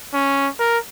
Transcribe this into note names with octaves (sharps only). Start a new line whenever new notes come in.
C#4
A#4